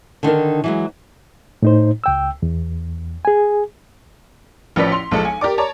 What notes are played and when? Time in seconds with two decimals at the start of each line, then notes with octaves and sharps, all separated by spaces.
0.23 D3 D#3 D4 A#4
0.64 E3 F#3 G#3
1.63 A2 D#4 C5
2.04 C#2 G5 E6
2.43 E2
3.25 G#4 G#5
4.76 A1 F3 C#4 B4 D5 B6
4.92 C6 F7
5.11 B1 F3 G#3 A4 C#7
5.25 G#5
5.41 G4 A#4 D5 D6
5.58 C#5 D5 A5 A#5 D6